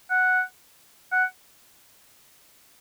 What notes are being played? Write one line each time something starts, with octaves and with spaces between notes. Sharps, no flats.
F#5
F#5